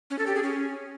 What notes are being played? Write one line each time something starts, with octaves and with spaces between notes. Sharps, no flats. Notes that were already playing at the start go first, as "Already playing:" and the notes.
C#4
A4
G4
G#4
C#4